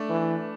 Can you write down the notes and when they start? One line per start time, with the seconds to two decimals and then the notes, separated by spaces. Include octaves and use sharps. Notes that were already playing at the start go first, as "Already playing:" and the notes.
Already playing: A3 D4
0.10 E3